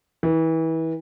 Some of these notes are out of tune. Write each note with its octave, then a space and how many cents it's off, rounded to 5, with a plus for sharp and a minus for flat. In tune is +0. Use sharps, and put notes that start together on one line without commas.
E3 -30